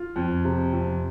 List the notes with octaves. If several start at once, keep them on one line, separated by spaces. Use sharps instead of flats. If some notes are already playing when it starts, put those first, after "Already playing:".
Already playing: F4
F2
C3
F2